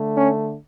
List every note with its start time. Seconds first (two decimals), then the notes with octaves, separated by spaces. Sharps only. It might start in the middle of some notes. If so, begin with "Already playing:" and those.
Already playing: D3 A3
0.14 C#4